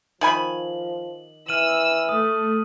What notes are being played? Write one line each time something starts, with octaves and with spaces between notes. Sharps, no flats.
D#3 F3 G#5 B5 F#7
E3 E6 F6 D#7 F#7
A3 D#6